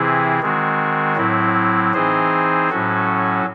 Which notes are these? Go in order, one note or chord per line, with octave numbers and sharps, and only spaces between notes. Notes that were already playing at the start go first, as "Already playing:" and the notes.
Already playing: C3 E3 C4 E4 G#4
D#3 G#3 C4 F#4
A2 F#3 C4 E4
E3 C4 D#4 G#4 C5
A2 F#3 C#4 F#4 A4